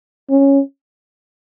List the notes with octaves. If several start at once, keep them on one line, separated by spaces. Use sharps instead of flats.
C#4